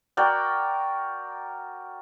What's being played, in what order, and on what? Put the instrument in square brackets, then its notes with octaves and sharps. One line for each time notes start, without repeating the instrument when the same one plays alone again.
[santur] F#4 A#4 D5 G5